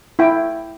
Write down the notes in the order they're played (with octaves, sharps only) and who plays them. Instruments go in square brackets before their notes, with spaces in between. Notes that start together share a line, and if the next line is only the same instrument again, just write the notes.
[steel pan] E4 G5